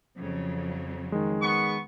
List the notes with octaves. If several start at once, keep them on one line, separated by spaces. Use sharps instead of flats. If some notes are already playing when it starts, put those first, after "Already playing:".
F2 C#3 F#3
D#3 G#3
B3 C#6